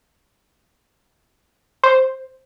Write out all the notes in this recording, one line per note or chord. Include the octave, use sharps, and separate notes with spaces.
C5